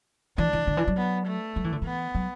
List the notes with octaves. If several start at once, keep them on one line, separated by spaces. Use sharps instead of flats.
E3 D4
E3
D3
E3
F#3
B3
A3
F#3
E3
D3
E3 B3
F#3